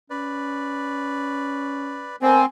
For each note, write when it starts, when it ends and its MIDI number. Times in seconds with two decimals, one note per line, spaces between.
0.10 2.11 61
0.10 2.16 71
0.10 2.16 74
2.22 2.44 57
2.22 2.44 59
2.22 2.45 60
2.22 2.41 70
2.22 2.44 74
2.22 2.42 80